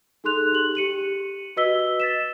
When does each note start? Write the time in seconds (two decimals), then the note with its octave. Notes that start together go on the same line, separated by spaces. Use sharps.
0.24 D#4 G#4 A4 C6 F#6 F7
0.52 G4 F#7
0.75 G4 C#7 D#7 F#7
1.57 F#4 B4 D#5 E6 B6 G7
2.00 A6 B6 E7